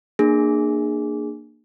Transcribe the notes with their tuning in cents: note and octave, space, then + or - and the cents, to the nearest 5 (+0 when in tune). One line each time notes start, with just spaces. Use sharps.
A#3 +0 D4 +35 G#4 +0